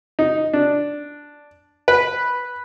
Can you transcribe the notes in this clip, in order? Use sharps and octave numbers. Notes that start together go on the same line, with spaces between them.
D#4
D4
B4